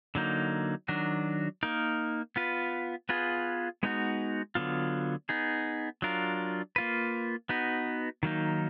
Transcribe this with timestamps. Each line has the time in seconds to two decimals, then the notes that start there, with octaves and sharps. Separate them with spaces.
0.15 D3 F#3 A#3 D#4
0.88 D#3 F#3 D4 F#4
1.63 A#3 D#4 A#4
2.36 B3 F4 B4
3.09 B3 F4 G#4 B4
3.83 G#3 B3 D#4 F#4
4.55 D3 F#3 B3 F4
5.29 B3 D#4 G#4
6.02 F#3 D4 F4 A#4
6.76 A#3 F4 B4
7.49 B3 D#4 F#4 B4
8.23 D#3 F#3 A#3 D#4